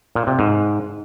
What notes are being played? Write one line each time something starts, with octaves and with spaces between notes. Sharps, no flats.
A#2
C3
G#2